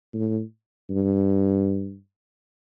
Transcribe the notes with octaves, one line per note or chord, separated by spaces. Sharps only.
A2
G2